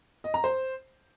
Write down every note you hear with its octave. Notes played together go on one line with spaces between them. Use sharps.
D#5
A#5
C5